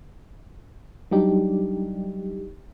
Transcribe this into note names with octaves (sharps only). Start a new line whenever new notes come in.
F#3 G3 D4 D#4 G4